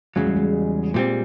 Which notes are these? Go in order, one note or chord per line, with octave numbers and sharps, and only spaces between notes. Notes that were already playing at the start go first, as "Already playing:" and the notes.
E2 C#3 F#3 G#3
G3
G#3
A#2 G3 C4